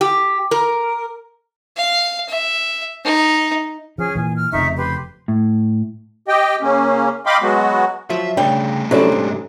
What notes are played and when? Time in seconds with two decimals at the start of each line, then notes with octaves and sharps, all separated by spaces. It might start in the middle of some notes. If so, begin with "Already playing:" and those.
0.01 G4
0.51 A#4
1.77 F5
2.29 E5
3.04 D#4
3.98 F3 C#4 G#4 F6
4.15 A#2 E3 G#5
4.36 F6
4.52 F1 F2 C#3 D#4 E5 C#6
4.76 G4 B4 C6
5.28 A2
6.28 G4 D#5 G5
6.62 C#3 A#3 C#4
7.26 D#5 F5 G5 B5 C6 D6
7.41 F#3 G#3 B3 F#4
8.10 F3 F#3 F4 E5
8.37 C#3 G3 A3 D4 C#5 G5
8.91 C3 F#3 C#4 D4 E4 A4 C#5
9.12 G#2